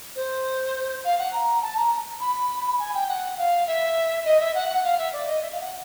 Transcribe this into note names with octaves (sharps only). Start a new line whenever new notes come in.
C5
F5
F#5
A#5
A5
A#5
B5
G#5
G5
F#5
F5
E5
D#5
E5
F#5
F#5
F5
E5
D5
D#5
E5
F5
F#5